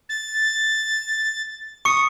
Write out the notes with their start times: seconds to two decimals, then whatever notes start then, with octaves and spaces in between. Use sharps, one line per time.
0.09 A6
1.85 C#6 D#6 C#7